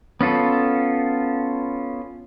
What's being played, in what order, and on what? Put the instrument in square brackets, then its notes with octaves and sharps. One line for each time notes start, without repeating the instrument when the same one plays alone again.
[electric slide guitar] B3 C#4 F4 A4